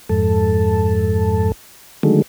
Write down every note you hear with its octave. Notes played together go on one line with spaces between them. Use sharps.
F2 G#2 A4
D3 D#3 F#3 G#3 A3